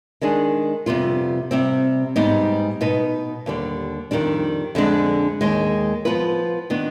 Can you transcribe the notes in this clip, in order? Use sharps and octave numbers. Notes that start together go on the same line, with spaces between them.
D#3 G#3 D4 G#4
F2 C3 G3 B3 F4
C3 G3 C4
G#2 G3 B3 D#4
B2 B3 D#4 B4
D#2 D3 G3
F2 D#3 G3 D4
F2 D3 G#3 D4
D#2 D#3 G#3
F3 B3 F4 B4
D#3 B3 D4